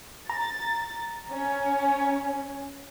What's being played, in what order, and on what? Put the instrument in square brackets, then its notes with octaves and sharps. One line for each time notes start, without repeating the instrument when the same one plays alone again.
[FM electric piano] A#5 [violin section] A6
[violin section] C#4